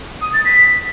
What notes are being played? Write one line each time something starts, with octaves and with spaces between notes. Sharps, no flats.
D#6
A6
B6